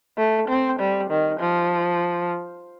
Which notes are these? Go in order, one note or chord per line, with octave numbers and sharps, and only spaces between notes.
A3
C4
G3
D#3
F3